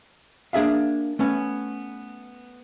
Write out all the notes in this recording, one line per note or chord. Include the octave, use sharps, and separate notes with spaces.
A#3 D4 G#4 E5 F5
A3 B3 C#4